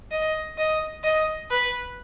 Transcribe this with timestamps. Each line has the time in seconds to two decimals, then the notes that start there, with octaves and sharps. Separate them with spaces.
0.11 D#5
0.58 D#5
1.04 D#5
1.50 B4